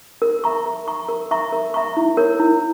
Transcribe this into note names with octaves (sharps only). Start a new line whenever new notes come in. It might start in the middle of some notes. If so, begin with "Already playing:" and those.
A#4
E5 A#5 C#6
A#4
E5 A#5 C#6
A#4
E5 A#5 C#6
A#4
E5 A#5 C#6
E4
A#4 C#5
E4